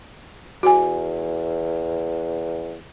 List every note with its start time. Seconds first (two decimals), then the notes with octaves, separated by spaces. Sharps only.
0.63 E2 F#4 G#5